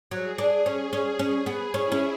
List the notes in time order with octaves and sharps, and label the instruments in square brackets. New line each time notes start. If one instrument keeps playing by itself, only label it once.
[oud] F#3 [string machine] G#4
[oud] D4
C#4
C#4
[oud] C#4 [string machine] G#4
[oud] B3
[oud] C#4 [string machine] E4
[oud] C#4